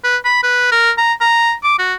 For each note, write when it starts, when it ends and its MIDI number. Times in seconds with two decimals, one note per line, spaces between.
0.04 0.17 71
0.25 0.42 83
0.43 0.67 71
0.72 0.91 70
0.98 1.13 82
1.21 1.53 82
1.63 1.77 86
1.79 1.94 66